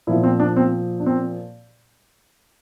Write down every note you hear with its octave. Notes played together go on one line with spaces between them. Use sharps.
A#2 F3 E4
C4
D4
C4
D4
C4